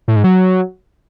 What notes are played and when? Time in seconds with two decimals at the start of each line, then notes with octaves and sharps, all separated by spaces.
0.08 A2
0.16 G#2
0.24 F#3